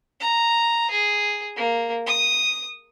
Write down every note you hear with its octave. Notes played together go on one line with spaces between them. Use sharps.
A#5
G#4
A#3
D#6